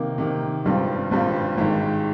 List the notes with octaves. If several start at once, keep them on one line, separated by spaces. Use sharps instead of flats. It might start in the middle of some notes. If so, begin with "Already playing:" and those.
Already playing: C3 D#3 A#3
C3 D#3 A#3
G#1 G2 G3 C4 F4
G#1 G2 G3 C4 F4
G#1 G#2 D#3